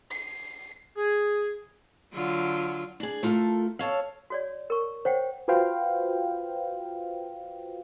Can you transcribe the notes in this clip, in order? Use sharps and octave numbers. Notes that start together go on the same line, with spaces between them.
C7
G#4
D3 F#3 F4
D4 G#4
A3 F4 F#4 A4 A#4
A4 C#5 F5
F#4 C#5 D5
A#4 C#6
C5 C#5 F#5 G5
F4 F#4 B4 C5 F5 G5